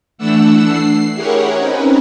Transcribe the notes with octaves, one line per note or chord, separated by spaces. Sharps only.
E3 A3 D4 F#5 E6
C7
E4 G4 G#4 A#4 C#5 F#5
C4 C#4 D#4 A#4 B4